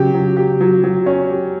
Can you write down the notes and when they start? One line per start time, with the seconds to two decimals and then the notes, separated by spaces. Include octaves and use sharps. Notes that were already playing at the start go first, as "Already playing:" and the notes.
Already playing: C#3 F#3 G4
0.14 F#3
0.37 G4
0.60 F#3
0.84 F#3
1.06 C#4
1.29 G4